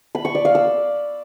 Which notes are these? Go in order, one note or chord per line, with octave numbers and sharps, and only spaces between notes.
B5
C#6
D5
F5
E6